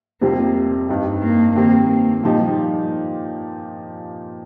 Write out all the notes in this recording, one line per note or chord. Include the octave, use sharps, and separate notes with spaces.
F2 C3 G3 A#3 C4 G4
G2 G3 D#4
A#3
D#3 A#3 C4 G4
A#3
A#2 F3 G3 D#4 G4